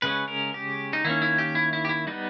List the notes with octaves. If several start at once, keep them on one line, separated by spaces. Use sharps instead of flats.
C#3 G#3 C#4 B4
A#4
G4
D#4
D#3 A#3 C#4 E4
E4
G4
E4
E4
G4
E4
G3 B3 D#4